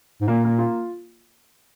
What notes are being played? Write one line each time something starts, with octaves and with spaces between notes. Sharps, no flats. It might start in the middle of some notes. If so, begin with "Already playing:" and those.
G#2
A#2 A#3
A#3
F4